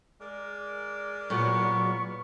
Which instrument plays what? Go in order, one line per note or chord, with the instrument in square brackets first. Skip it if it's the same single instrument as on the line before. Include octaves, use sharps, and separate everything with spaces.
[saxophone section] G#3 A#4 D5
[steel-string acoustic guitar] A#2 B3 [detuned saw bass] F#3 [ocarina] C#6